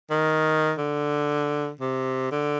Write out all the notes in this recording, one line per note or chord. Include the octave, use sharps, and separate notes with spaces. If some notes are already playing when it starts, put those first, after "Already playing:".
D#3
D3
C3
D3